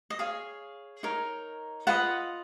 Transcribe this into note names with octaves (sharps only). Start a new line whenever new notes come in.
D#5
G#4 C#5 F5
D#4 A#4 C#5
F4 B4 D#5 F#5